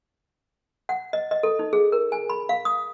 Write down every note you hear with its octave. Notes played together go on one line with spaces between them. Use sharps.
F#5
D#5
D#5
A4
D#4
G#4
A#4
G#5
B5
F5
D#6